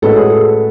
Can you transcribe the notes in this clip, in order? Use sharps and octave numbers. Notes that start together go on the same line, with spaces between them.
A2 G#3 C#4 F#4 A4 B4
G#4
A4